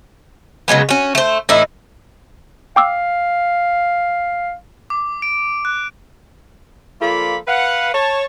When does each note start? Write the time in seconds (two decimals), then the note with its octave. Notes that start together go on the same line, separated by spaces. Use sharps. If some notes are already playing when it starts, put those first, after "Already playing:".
0.68 C#3 F#3 G#3 B3
0.89 C#4 F#4
1.15 A3 C5
1.49 A2 E3 D#4 E4
2.76 F5 G5 D6 E6
4.90 D6
5.22 D7
5.65 F#6
7.01 F3 A#3 F4 A4 D5 B5
7.48 B4 F5 F#5
7.93 C#5 A5